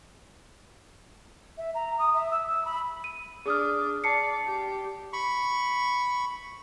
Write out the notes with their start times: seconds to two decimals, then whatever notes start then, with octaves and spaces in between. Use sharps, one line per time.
1.58 E5
1.75 A#5
1.99 D#6
2.14 E5
2.31 E6
2.48 E6
2.65 B5
3.04 D#7
3.46 D4 G#4 D#6 F6
4.04 D5 A5 C7 C#7
4.46 G4
5.13 B5 C#6